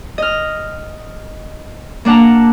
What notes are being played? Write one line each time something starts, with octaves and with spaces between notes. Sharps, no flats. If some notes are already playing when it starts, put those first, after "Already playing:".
D#5 F6
A#3 D4 F#5 A5 A#5